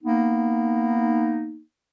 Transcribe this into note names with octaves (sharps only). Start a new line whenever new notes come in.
A#3 B3 D#4